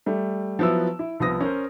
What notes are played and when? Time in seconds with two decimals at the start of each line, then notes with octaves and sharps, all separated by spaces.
0.06 G3 A3
0.59 F3 F#3 B3 E4 E6
0.99 E4
1.20 C2 F3 B3 D#6 A#6
1.40 C#4 A#4 C5